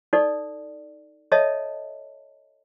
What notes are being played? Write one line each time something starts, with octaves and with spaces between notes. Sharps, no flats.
D#4 A4 D5
A4 C#5 D#5 E5 A5